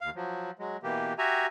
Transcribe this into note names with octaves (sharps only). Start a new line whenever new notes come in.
D#2 F5
F3 F#3
F#3 G#3
B2 E3 A#3 G4
F#4 G4 E5 G#5 A#5